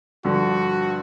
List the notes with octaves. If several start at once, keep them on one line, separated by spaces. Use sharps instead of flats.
G2 D3 F3 F#4